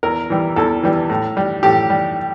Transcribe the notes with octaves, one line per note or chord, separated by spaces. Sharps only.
E2 A#4
E3 G3
E2 A4
E3 G3
A2
G3
A2 G4
G3